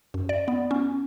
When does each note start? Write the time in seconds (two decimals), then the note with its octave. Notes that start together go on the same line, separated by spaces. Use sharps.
0.14 F#2
0.29 D5
0.48 B3
0.71 C#4